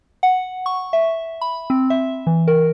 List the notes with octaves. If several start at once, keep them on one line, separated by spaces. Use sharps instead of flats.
F#5
C#6
E5
B5
C4
E5
E3
A#4